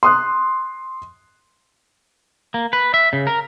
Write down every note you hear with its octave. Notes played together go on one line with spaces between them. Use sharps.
C6 D#6 F#6
A#3
B4
E5
C#3
A#4